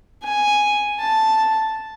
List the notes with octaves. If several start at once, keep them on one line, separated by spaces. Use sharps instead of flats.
G#5
A5